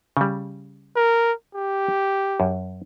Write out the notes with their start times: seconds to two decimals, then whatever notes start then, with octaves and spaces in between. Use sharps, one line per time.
0.17 C#3 G3
0.96 A#4
1.55 G4
2.40 F#2